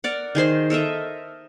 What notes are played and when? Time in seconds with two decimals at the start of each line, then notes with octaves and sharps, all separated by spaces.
0.04 A#4 D5 F#5
0.35 D#3 G#4 C5 C6
0.70 A4 A#4 D#5 E5